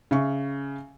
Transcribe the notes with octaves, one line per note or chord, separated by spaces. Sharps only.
C#3 E5 C#6